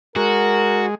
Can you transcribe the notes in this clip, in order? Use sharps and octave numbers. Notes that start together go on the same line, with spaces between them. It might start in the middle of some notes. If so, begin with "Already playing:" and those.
G#3 F#4 A#4